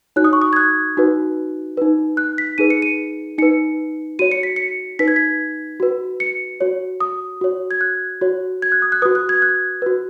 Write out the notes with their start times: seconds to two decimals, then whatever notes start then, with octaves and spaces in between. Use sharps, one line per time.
0.16 D#4 F#4 C#5 F#6
0.24 D#6
0.33 C#6
0.42 D#6
0.53 G#6
0.56 F#6
0.97 D#4 F#4 B4
1.77 D#4 B4
2.17 F#6
2.38 B6
2.58 D#4 G#4 B4 D#7
2.70 C#7
2.82 D#7
3.38 D#4 B4 C#7
4.19 F#4 C#5 D#7
4.31 C#7
4.43 B6
4.56 C#7
4.99 D#4 B4 B6
5.08 G#6
5.16 B6
5.80 F#4 B4
6.20 C#7
6.61 F#4 C#5
7.00 D#6
7.41 F#4 C#5
7.71 G#6
7.81 F#6
8.21 F#4 C#5
8.62 G#6
8.72 F#6
8.82 D#6
8.92 F#6
9.02 F#4 B4 D#6
9.15 F#6
9.29 G#6
9.42 F#6
9.82 F#4 B4